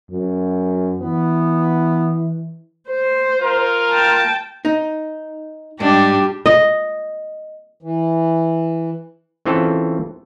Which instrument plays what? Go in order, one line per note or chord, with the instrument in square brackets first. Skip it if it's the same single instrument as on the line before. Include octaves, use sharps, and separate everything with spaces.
[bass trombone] F#2
[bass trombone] E3 [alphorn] B3
[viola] C5
[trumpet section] F4 A#4
[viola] G5 A5
[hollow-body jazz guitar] D#4
[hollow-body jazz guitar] G#2 [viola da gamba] G3 G4 [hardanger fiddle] D4
[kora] D#5
[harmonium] E3
[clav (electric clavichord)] C#3 E3 C4 F4 A4